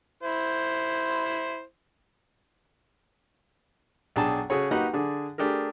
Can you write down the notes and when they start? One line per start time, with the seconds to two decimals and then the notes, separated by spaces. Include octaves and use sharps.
0.23 E4 C5
4.16 B1 D4 G#4 G5 A5
4.50 C#3 F#4 G#4 A4 C#5
4.71 A#3 D#4 F#4 G4 B4 F#5
4.93 D3 D4 G#4
5.38 A3 D4 G4 G#4 A#4